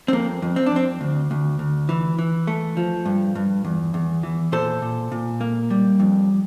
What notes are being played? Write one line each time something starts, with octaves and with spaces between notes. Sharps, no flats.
C4
F2 A#3
F2
C4
D4
F2 C4
D2
D2
D2
E3
E3
A3
F3
G2
G2
E2
E2
E3
A#2 A4 C5
A#2
A#2
A#3
G3
F2